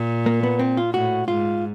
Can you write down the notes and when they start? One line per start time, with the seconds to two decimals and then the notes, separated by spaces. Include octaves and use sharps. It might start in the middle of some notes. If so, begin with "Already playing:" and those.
Already playing: A#2
0.26 A#3
0.43 B3
0.59 C4
0.77 F4
0.93 A2 F#4
1.28 G#2 F4